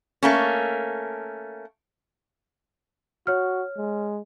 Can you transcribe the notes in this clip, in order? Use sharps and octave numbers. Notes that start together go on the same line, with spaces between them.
A3 A#3 C#4
F#4 C#5 F6
G#3